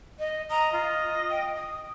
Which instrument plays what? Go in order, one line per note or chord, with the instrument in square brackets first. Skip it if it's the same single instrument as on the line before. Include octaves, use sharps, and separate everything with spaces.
[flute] D#5
[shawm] D#5 [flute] A#5
[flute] F4
G5
D#6